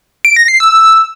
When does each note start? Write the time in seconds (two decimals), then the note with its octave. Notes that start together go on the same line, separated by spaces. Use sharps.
0.25 D7
0.36 A#6
0.48 C7
0.60 E6